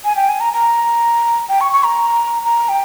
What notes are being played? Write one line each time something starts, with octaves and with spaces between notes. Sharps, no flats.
G#5
G5
G#5
A#5
A#5
G5
C#6
C#6
A#5
A#5
G5